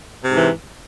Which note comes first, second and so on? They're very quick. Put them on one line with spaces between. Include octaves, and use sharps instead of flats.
C3 G#2 E3